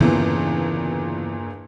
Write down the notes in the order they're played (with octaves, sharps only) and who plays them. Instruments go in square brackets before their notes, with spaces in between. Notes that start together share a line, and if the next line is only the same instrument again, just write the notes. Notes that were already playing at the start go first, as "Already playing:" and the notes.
[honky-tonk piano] G1 E2 A#2 [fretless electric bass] C#3 E3 C#4